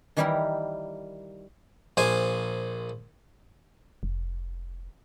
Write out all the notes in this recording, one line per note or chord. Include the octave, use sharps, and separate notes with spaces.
D#3 E3 G3 E4 G4 A#4
A#1 C5 G#5
F1